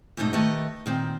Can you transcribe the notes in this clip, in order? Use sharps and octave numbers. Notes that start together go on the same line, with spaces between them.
E2 G#2 B2 A3 D#4
D#3 A3 G4 B4 D#5
A#2 D#3 C4